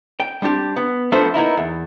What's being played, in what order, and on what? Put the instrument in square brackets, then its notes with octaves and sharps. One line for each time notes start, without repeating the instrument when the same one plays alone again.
[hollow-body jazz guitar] G5
G3 C4 D4 G4
B3
F3 A3 B3 D4 C5
A#3 B3 D#4 E4
E2